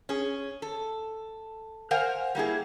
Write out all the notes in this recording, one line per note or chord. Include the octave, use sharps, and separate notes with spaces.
C#4 G#4
A4
A#4 C5 F5 F#5 G#5
G3 A#3 E4 G#4